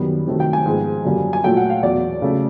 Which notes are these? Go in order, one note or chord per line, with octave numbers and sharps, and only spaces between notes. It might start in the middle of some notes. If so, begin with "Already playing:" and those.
Already playing: F#2 D#3 G3 B3
C3 D#3 F#3 A3
G5
G#5
G#2 F3 G#3 B3
F#2 D3 G3 A#3
G#5
A#2 F#3 A3 G5
F#5
F5
E2 B2 F#3 D5
C#3 F#3 A3